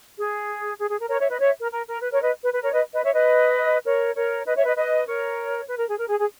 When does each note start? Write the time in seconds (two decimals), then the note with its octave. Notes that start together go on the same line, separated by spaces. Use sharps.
0.18 G#4
0.79 G#4
0.89 G#4
0.99 A#4
1.09 A#4 C#5
1.20 C#5 E5
1.30 B4 D#5
1.40 C#5 E5
1.60 A#4
1.71 A#4
1.86 A#4
2.01 B4
2.11 A#4 C#5
2.22 B4 D#5
2.42 B4
2.52 B4
2.62 A#4 C#5
2.72 B4 D#5
2.93 B4 D#5
3.03 C#5 E5
3.13 B4 D#5
3.84 A#4 C#5
4.15 A#4 C#5
4.46 B4 D#5
4.56 C#5 E5
4.66 B4 D#5
4.76 B4 D#5
5.07 A#4 C#5
5.68 B4
5.78 A#4
5.88 G#4
5.98 A#4
6.08 G#4
6.19 G#4